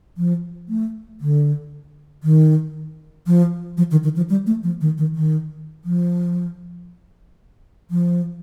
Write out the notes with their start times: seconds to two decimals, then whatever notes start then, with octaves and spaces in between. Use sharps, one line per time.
0.17 F3
0.69 A3
1.21 D3
2.23 D#3
3.27 F3
3.77 F3
3.91 D#3
4.03 D#3
4.16 F3
4.30 G3
4.47 A3
4.63 F3
4.81 D#3
4.98 D#3
5.15 D#3
5.85 F3
7.91 F3